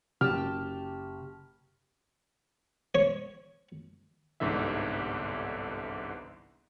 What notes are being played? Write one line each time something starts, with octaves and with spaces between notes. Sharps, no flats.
F#1 G4 G5 A5 F6
C#5
G1 C2 G#2 D3 E3 E5